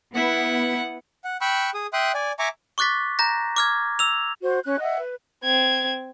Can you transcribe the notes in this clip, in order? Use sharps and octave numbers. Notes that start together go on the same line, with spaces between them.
B3 E4 F#5
F#5
G5 B5 C#6 E6 F#6
G#4 D#6
E5 G5 C6 D#6 F#6
D5 G#5
E5 G#5 A#5 C#6 D6
C#6 D6 F#6 A6 B6
A#5 G6 A#6
D6 F6 G#6
E6 F7
F#4 C5
C#4 F#6
D#5 E5 F#5
B4
C4 G#6